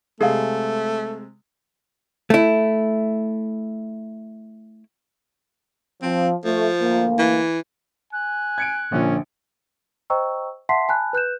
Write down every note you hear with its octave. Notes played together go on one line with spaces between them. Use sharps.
C3 G#3 A3 G#4 F5
A3 E4
F3 C4
F3 A3
D2 A#3
E3
G#5 F#6
G#6 C#7 D7
A#1 A#2 D3 C#4
C5 D#5 G5 A#5 C#6 E6
E5 F#5 A5 C6 B6 C7
G#5 A5 B5 F#6
B4 F#6 G6 E7